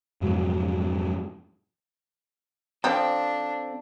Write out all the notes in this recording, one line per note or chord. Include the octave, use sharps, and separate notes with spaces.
F2 G#2 C3 F#3
F3 C4 D4 A4 C5 G5